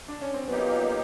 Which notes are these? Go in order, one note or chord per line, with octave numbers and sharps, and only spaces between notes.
D4
C#4
C4
A#2 F#3 A#3 B3 D#4 G4